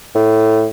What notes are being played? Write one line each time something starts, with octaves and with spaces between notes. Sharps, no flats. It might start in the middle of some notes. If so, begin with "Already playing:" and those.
A2